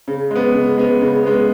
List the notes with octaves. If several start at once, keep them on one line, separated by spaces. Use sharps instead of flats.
C#3
G#3 B3
C#3
G#3 B3
C#3
G#3 B3